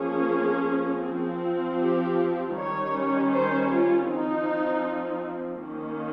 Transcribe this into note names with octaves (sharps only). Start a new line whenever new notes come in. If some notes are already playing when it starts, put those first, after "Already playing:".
Already playing: F3 A#3 C#4 G#4
F3 C4
G4
D#3 G3 C#4 C#5
C5
F4
F3 C4 D#4
D#3 A#3 C#4